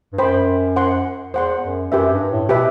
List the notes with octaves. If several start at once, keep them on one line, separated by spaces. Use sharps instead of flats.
G2
F#2 C5 G5 B5
C5 F#5 C6
E2 C5 F#5 C6
F#2
F#2 G4 B4 E5
G2
A2
B2 G4 B4 E5